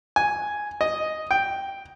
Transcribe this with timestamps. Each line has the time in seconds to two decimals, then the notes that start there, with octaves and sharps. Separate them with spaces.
0.16 G#5
0.81 D#5
1.31 G5